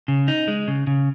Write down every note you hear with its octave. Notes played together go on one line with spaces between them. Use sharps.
C#3
D#4
G#3
C#3
C#3